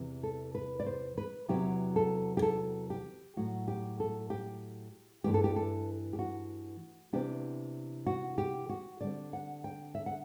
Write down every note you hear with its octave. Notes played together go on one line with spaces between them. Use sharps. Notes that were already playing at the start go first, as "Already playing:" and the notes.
Already playing: E2 C3 E3
A4
B4
D5
C5
B4
E2 C3 F#3 B3 E4 G4
A4
G4
A4
G4
A2 F#3 A3 F#4
G4
A4
G4
G2 E3 A3 D4 G4
A4
G4
A4
G4
F#4
C3 E3 B3 D4 G4
F#4
G4
F#4
D3 G3 C4 D5
F#5
G5
E5
F#5